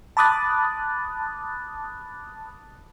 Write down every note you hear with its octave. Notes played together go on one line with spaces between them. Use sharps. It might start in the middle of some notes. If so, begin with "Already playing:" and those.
A5 B5 D6 D#6 F#6 A6